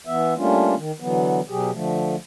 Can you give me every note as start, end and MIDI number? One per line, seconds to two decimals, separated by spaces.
0.07 0.34 52
0.07 0.34 59
0.07 0.34 76
0.37 0.75 55
0.37 0.75 57
0.37 0.75 58
0.37 0.75 61
0.37 0.75 62
0.37 0.75 65
0.77 0.92 51
1.00 1.41 50
1.00 1.41 52
1.00 1.41 54
1.00 1.41 59
1.49 1.71 47
1.49 1.71 54
1.49 1.71 67
1.49 1.71 68
1.72 2.16 50
1.72 2.16 53
1.72 2.16 57